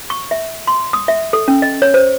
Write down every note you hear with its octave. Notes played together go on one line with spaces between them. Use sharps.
C#6
E5
C6
D#6
E5
A4
C#4
D#5
C#5
C5